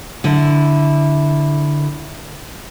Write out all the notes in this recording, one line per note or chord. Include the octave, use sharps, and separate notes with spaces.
D3 E4